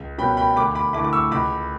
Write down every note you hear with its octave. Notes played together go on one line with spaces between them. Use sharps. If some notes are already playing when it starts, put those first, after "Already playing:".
Already playing: C#2
B2 G3 C#4 G5 B5
G5 B5
D2 B5 D6
B5 D6
D3 A3 E4 B5 D6
D6
C#6 E6
C#2 B5 D6